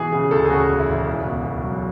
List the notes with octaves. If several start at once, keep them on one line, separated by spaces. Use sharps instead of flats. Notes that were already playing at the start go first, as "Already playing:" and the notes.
Already playing: B2 E3 G#4
C#3 G#4
D2 A4
G#4
C#3 F#4
E1
E4
E1
C#2
B2
B2
F#3